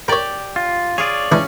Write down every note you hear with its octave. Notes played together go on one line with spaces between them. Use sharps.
G4 A#4 C#5 D5
F4
F4 G#4 C#5 D5
C#2 E3 C#4 D4